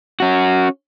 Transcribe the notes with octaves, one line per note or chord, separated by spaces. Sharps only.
C#4 F#4